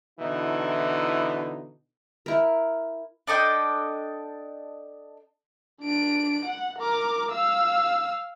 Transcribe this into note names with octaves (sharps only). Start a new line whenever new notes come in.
B2 D3 E3 D#4 E4
E4 A#4
D4 A4 D#5 G5
D4 D7
F#5
A#4 D6
F5 E6